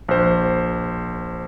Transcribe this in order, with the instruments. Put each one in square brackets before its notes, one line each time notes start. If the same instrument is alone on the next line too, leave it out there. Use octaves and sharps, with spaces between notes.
[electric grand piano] A#1 C5